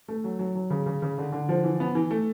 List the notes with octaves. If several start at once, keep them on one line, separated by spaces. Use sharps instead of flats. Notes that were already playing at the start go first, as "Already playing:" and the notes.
A3
F#3
F#3
F#3
C#3
C#3
C#3
D3
D3
F3
E3
B3
E3
A3